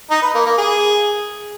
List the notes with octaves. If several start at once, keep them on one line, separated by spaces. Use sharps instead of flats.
D#4
B4
A#3
A#3
G#4